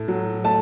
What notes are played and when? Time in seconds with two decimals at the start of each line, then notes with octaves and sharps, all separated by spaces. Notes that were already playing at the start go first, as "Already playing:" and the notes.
Already playing: A2 A3
0.08 F#3
0.44 A3 A5